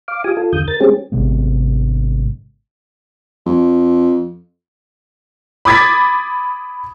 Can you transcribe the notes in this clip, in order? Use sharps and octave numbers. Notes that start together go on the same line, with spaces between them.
F5 D6
F4 G4 G#5 D#6
F4 A4
E2 D3 D#6 G6
A#4 A6
G#3 C4 C#4 G4 G#4
G#1 C3 G#3 B3
F2
B5 D6 D#6 G#6 A6 B6